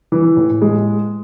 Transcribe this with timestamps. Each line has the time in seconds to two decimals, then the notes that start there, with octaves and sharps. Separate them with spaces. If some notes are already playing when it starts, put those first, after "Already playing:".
0.12 E3
0.37 A2
0.62 G#3